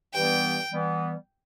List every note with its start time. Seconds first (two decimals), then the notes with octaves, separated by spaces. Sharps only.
0.14 G2 E3 G3 B3 G5
0.70 E3 G3 B3